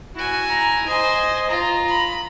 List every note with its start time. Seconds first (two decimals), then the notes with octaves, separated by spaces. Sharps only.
0.16 E4 F#4 G#5
0.50 A#5
0.86 C5 D#5 G#5
1.49 F4 A#5
1.89 B5